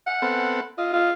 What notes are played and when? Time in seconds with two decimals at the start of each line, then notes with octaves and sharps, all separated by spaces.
0.07 F#5
0.22 B3 C4 A4
0.78 F4 D#5
0.93 F4